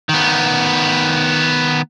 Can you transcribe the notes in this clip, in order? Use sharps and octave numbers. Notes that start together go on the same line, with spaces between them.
D#3 B3